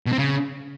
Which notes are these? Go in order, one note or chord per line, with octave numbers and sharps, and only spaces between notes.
B2
C4
C#3